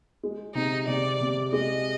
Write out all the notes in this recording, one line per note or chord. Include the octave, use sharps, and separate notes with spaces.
G#3
C3 D#4
C3 D5
C3
G#3 D#5